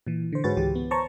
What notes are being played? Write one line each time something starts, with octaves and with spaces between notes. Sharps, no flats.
A#2 E3
D3 C5
G#2 F#4 G#4 B4 C#5 A6
C#2 D3 E3 G4
B3
C5 C#5 A5 A#5 C#6